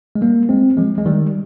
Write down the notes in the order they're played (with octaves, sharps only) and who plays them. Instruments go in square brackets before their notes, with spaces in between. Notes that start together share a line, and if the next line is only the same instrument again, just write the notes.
[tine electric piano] G#3
G3 A#3
G#3 C4
F3 G#3
G#3
D#3 G3